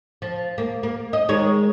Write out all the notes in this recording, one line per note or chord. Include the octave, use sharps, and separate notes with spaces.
F3
A#3
A#3
D#5
D#3 G#3 C#5